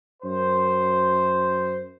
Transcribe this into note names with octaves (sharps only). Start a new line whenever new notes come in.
F#2 C5